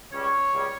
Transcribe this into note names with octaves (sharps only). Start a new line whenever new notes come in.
C#2 C#3 G3 C#4 C#5
C#2 C#3 G3 C#4